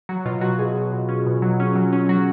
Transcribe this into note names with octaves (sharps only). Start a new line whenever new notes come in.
F#3 F#4
B2 F4
F#3 F#4
B2 G#4
B2
B2
C#4
B2
F#3
C#4
F#3
C#4
F#3 F#4